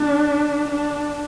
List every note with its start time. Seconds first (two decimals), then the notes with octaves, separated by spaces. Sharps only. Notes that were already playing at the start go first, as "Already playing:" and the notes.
Already playing: D4
0.69 D4